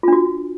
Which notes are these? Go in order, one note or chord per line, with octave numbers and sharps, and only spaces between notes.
D4 F4 F#4